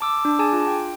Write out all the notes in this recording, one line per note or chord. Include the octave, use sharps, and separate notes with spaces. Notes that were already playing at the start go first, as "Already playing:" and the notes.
A5 D6 E6
D4
G#4 G#5 A5 D6
F4
G5